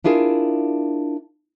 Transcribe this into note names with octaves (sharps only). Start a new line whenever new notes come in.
D4 E4 F4 G#4 A#4